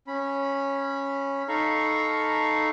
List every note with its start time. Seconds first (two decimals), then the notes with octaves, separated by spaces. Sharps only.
0.08 C#4 B5
1.48 D#4 A4 F5 A#5 B5 C#6